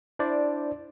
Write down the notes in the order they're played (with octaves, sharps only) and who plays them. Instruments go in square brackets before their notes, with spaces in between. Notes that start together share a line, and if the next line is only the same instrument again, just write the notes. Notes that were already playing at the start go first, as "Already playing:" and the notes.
[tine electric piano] D4 E4 C5 D5